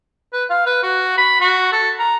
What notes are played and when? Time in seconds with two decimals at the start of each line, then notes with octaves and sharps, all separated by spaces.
0.33 B4
0.50 F5
0.66 B4
0.83 F#4
1.18 B5
1.41 F#4
1.72 A4
1.99 A#5